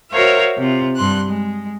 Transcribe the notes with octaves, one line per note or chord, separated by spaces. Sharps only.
F#4 A#4 C5 C#5 E5 F5
C3 F4
G2 C6 F#6
G#3